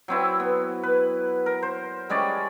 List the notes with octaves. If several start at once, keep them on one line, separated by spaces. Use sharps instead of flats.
F#3 C4 E4
B3
B4
A#4
C5
G3 G#3 C#4 D5